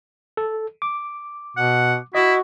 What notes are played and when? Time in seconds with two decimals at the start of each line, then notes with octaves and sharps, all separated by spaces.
0.37 A4
0.82 D6
1.57 B2 F#5
2.15 E4 F#4 D#5